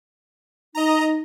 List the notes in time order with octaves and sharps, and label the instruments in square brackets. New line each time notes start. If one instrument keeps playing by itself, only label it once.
[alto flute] D#4 [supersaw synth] D#5 A#5